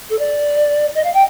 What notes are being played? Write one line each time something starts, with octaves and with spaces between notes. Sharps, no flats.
A4
D5
D#5
F5
G5